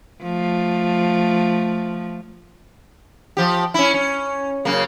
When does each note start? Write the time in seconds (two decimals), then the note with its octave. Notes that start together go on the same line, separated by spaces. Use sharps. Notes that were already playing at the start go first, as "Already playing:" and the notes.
0.22 F3 A3
3.37 F3 G4
3.74 C#4 E4
3.94 C#4
4.65 F#2 C#3 A#3